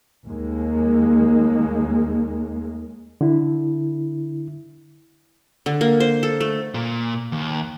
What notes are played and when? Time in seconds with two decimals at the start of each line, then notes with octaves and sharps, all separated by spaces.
0.25 D#2 G#3 A#3
3.21 D3 E4
5.66 D3
5.81 A#3
6.00 C5
6.23 A4
6.41 A3
6.74 A#2
7.32 D#2